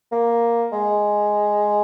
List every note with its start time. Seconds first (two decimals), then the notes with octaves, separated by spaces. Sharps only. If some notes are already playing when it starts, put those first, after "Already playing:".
0.12 A#3
0.72 G#3